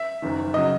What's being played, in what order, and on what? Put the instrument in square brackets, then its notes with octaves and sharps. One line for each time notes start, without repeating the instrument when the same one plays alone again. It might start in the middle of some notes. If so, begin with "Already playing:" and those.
Already playing: [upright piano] E5
F#1 F#2 D#3
C#3 F#3 D#5